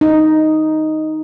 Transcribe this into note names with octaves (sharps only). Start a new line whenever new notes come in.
D#4